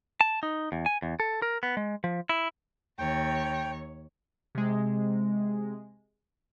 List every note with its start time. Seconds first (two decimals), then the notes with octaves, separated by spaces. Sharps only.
0.21 A5
0.43 D#4
0.72 E2
0.86 G#5
1.02 E2
1.20 A4
1.42 A#4
1.63 B3
1.77 G#3
2.04 F3
2.29 E4
2.99 D#2 C#5 G5
4.55 C3 G#3